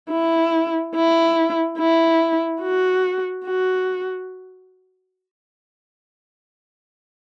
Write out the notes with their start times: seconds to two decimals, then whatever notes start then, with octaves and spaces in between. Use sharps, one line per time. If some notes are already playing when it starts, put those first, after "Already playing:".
0.11 E4
0.95 E4
1.79 E4
2.62 F#4
3.46 F#4